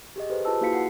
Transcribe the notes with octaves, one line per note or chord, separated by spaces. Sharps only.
G4 G#4 D#5
G4 A4 B4 C5
F4 G#4 B4 A5 E6
A#3 E4 F#4 F5 B6 C#7
F#5 C7